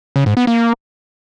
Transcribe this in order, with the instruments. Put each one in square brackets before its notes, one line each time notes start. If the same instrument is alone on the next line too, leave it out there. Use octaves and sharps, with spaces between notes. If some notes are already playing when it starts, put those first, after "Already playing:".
[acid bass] C#3
G#2
B3
A#3